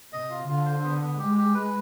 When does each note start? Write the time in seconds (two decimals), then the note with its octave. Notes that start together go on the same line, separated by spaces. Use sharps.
0.13 C3 D#5
0.30 F4
0.48 D3 F4
0.66 C5
0.84 B3
1.01 B3
1.18 G#3 G4
1.37 G4
1.54 B4